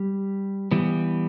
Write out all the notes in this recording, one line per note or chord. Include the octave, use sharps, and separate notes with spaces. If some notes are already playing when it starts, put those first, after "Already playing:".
Already playing: G3 G4
E3 G3 B3